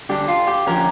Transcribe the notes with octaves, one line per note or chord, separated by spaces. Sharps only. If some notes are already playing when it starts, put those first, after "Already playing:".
D3 G3 D4 G4
F4
G4
D3 F3 C#4 A#4